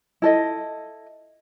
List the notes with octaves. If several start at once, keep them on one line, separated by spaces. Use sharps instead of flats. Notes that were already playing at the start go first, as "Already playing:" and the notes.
E4 A4 D#5